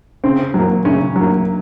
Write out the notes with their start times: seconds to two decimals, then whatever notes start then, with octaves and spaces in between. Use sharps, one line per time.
0.24 C#3 C4
0.54 F#3 A#3
0.85 C#3 C#4
1.16 F#3 A#3